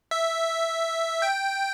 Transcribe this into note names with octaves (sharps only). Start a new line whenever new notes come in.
E5
G5